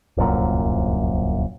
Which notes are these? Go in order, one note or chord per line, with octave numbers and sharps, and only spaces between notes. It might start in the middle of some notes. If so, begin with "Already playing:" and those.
D1 C2 F#2 A#2